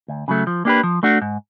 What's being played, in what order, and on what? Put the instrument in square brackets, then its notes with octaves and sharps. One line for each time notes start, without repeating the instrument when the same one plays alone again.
[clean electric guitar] D2
C#3 F#3 A3
F3
A#3 D4 G4 B4
F3
A3 D4 F#4
G#2